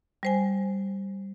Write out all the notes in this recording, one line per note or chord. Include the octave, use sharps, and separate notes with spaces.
G3 C5 G#5